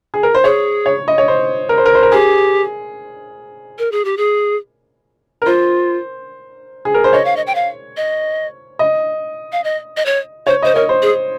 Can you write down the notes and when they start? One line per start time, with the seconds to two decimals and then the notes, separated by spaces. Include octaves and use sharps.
0.14 G#4
0.23 A#4
0.35 C5
0.44 G#4 C#5
0.86 C#5
1.08 D#5
1.18 C#5
1.28 C5
1.69 A#4
1.78 C5
1.86 A#4
1.95 C5
2.03 A#4
2.12 G4 G#4
3.78 A#4
3.92 G#4
4.05 G4
4.17 G#4
5.42 A#4
5.46 F4 C5
6.85 G#4
6.94 A#4
7.04 C5
7.13 C#5 D#5
7.25 F5
7.36 D#5
7.47 G5
7.55 F5
7.97 D#5
8.79 D#5
9.52 F5
9.64 D#5
9.97 D#5
10.06 C#5
10.47 C5 C#5
10.62 C5 D#5
10.75 A#4 C#5
10.89 C5
11.02 G#4